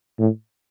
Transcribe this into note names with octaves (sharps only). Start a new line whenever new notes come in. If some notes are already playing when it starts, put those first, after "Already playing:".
A2